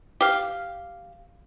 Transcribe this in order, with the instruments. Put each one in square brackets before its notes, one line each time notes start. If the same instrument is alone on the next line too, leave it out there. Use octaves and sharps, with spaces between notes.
[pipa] G4 F5